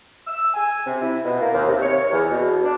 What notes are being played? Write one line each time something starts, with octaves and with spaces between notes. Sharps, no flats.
E6
G#5
C3
E4
B2
A#3
D#2
C3
C#5
E2
B2
D4